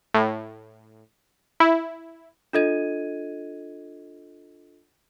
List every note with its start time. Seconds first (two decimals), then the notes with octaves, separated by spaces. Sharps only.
0.14 A2
1.60 E4
2.53 D4 F4 A4 D#5 G#6 D#7